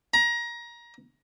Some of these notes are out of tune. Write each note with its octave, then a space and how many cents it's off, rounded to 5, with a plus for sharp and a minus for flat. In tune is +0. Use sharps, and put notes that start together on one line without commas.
A#5 +25